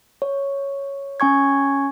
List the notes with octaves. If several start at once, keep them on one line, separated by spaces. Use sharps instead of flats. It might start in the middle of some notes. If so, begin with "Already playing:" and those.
C#5
C#4 G#5 C#6 G#6